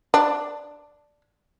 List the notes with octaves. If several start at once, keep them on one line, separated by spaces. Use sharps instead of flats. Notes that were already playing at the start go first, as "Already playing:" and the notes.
D4